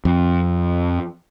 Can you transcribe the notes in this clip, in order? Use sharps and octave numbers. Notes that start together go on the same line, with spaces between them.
F2